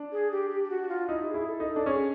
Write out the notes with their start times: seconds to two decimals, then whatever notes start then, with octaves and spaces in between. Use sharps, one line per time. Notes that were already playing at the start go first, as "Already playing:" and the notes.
Already playing: D4
0.12 G#4
0.32 G4
0.50 G4
0.64 G4
0.70 F#4
0.89 F4
1.08 D#4 E4
1.23 G4
1.28 G#4
1.34 E4
1.47 A4
1.60 D#4
1.67 A4
1.76 D4
1.86 C#4 G#4